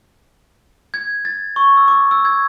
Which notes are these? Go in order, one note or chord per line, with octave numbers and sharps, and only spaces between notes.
G#6
A6
C#6
E6
D6
E6
G#6